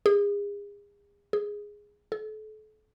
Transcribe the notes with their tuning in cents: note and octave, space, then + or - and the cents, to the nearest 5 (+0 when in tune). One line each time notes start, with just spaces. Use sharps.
G#4 -35
G#4 -5
A4 -35